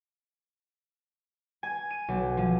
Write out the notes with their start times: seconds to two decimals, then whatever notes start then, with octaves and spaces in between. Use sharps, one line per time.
1.63 G#5
1.91 D#7
2.08 B1
2.37 F3